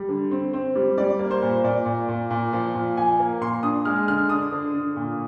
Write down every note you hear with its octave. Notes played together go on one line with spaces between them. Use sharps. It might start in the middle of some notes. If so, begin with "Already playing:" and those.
Already playing: G3
D3
C4
C4
G3
G3 D5
A#3
C5
A#2
A#2 D5
A#2
A#2
A#2
F3
A#2
F3 G#5
A#3
A#2 C6
D4 D#6
G#3 F6
D3 F6
D4 D#6
D3
D3
A#2